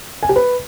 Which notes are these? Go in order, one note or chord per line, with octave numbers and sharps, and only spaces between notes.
G#5
G4
B4